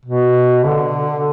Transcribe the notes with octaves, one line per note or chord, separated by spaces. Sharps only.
B2
D3